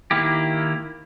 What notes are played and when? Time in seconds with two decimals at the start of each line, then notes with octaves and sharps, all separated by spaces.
0.11 D#3 A#3 E4 G4